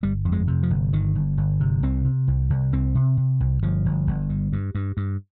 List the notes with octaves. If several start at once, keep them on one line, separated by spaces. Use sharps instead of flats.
G1 G3
F2
G#3
C3
F3
G1
G1 D#3
G1
G1
C3
C2 C4
C3
C2
C2
C2 C4
C3
C3
C2
G1 F3
G1
G1
G2
G2
G2
G2